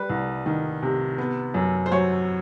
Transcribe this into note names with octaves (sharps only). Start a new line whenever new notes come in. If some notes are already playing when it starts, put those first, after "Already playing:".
Already playing: G3 B4
C2
D#3
C3
B3
F#2
C5
F#3 C#5